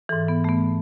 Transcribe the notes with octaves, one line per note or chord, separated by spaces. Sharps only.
G#2 E3 A4
B3
A3
B3